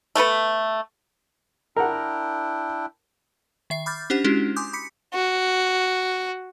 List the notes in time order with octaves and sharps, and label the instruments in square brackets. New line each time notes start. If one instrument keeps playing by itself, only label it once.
[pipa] A3 B3 A4 B4
[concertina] D4 E4 G5 [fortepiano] A#4 F#5
[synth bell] D#3 E5 C7
B5 D6 F6 G6 A6
C#4 D4 G4 C5 F#5
G#3 C#4 D4 E4 F#4 G4
G#5 C6 D6 D#6 G6
B5 D6 B6 C#7
[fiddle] F#4